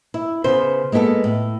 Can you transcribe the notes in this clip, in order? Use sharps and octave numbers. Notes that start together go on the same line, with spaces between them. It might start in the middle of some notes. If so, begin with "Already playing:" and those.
E4
C#3 B3 C5
G#3 A#3 B3 G4 A4
A2